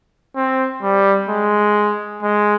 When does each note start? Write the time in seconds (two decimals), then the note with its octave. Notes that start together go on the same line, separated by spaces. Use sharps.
0.36 C4
0.83 G3
1.29 G#3
2.23 G#3